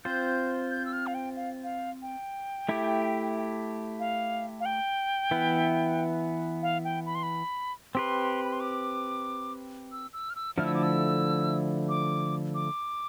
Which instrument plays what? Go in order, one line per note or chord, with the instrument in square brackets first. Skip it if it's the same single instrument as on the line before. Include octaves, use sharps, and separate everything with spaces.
[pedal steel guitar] C4 F4 C5 [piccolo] G6
[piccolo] G6
E6
F6
F5
G5
F5
F5
G5
[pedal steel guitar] A3 E4 G4
[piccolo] F5
F5
G5
[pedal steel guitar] E3 B3 E4 B4
[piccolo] F5
G5
B5
C6
B5
[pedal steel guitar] C4 G4 B4 [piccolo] C6
[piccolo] B5
C6
D6
E6
E6
F6
E6
[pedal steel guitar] D3 F3 A3 E4 [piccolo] F6
[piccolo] E6
D6
E6
D6
D6